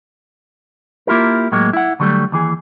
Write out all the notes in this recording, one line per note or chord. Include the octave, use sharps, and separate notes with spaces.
A#3 E4 F4 G4 A#4
A2 F#3 G#3 A#3
E4 F#5
D3 F#3 G3 A3
D#2 E3 G#4